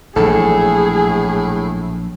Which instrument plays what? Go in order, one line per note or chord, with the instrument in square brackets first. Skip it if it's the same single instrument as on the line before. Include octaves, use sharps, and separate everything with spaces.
[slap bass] A#1 E3 F#3 [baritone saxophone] A2 [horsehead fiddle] G#4 [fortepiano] A4